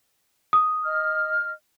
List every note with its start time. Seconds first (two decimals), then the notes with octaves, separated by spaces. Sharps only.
0.53 D#6
0.85 D#5 F6